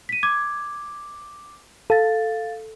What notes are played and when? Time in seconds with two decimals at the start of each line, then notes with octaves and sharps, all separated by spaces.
0.09 B6 D#7
0.23 D6 G#6
1.90 A4 F5 A6